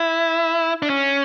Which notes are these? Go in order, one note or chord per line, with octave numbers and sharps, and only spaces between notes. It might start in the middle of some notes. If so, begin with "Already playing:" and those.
Already playing: E4
D4
C#4